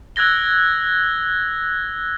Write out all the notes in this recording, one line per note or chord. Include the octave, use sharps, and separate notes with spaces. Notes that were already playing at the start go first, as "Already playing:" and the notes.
E6 F#6 G#6 A#6 G7